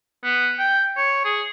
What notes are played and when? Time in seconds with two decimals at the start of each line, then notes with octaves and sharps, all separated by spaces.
0.24 B3
0.59 G5
0.97 C#5
1.25 G#4